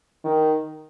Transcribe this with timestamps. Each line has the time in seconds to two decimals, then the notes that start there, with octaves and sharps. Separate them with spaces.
0.24 D#3